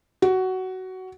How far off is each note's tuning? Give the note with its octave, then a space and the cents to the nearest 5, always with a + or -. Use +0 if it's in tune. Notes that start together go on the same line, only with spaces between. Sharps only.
F#4 +15